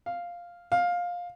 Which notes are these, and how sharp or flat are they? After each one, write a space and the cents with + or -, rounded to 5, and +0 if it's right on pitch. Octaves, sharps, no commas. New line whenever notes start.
F5 +0
F5 +15